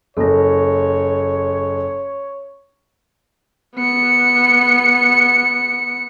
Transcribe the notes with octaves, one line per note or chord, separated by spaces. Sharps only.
F#1 A4 C#5 A#6
B3 C#7